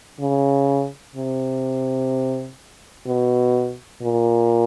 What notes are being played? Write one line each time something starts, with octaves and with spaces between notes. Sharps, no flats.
C#3
C3
B2
A#2